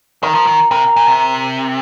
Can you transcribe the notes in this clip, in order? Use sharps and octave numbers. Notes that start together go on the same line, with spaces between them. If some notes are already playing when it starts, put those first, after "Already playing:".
D#3 A#4
F3
D#3
C3 A#4
A#2
C3